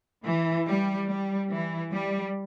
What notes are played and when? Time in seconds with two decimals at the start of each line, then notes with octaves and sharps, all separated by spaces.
0.24 E3
0.67 G3
1.08 G3
1.51 E3
1.92 G3